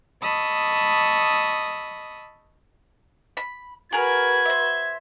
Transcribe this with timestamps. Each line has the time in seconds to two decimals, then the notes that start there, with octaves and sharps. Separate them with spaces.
0.21 D#5 A5 B5 C#6 D#6 E6
3.37 B5
3.92 F#4 G#4 A#4 B4 G#6
4.45 C5 E5